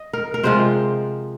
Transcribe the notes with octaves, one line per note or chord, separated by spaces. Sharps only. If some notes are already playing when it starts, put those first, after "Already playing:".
Already playing: D#5
A#4
A#4
C3 F3 G#3 F4 C5